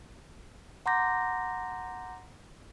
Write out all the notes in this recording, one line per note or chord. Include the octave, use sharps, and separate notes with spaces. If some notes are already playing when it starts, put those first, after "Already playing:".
F#5 A#5 C6 D6 G6 A#6